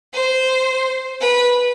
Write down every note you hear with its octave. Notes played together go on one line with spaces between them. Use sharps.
C5
B4